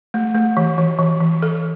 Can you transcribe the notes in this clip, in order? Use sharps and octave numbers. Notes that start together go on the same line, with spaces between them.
A3
A3
E3
E3
E3
E3
A4